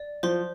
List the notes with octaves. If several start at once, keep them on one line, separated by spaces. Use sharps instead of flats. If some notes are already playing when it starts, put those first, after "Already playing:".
Already playing: D5
F3 C5 C6